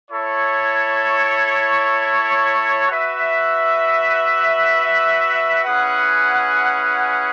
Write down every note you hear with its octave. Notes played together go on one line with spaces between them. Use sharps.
E4 A4 C#5
F#4 B4 E5
C#4 E4 G#4 B4 F#5